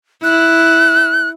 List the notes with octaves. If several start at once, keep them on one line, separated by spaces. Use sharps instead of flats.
E4 F#6